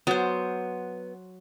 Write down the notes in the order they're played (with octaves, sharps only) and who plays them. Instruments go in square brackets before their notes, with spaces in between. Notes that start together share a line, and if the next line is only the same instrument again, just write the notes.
[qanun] F#3 C5 [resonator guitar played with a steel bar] B3